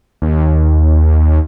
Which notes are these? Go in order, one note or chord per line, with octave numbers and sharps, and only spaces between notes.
D#2